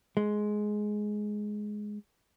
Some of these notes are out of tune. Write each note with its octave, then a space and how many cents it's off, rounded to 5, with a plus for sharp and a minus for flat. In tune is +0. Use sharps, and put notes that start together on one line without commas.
G#3 +10